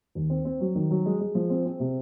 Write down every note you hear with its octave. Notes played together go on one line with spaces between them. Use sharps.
D#2
C4
C4
F#3
D#3
F#3
G#3
G#3
F3
C4
C4
C3